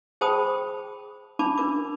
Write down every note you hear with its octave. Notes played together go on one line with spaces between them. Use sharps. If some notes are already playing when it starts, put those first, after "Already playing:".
G#4 C5 G5 A5 B5 D#6
C#4 D4 A5 B5 D6
D4 A#4 D6